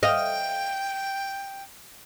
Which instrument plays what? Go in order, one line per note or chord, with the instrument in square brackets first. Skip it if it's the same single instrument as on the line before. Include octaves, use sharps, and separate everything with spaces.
[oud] D#5 F5 [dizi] G5